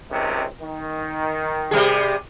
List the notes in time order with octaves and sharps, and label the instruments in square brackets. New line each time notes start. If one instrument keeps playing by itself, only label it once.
[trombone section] C#2 C3 D#3
D#3
[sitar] C3 G3 G#4